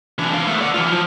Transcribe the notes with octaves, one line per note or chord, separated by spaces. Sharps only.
E3 D4
D4 F5
A3 B3
D5 F#5
E3 F4
F3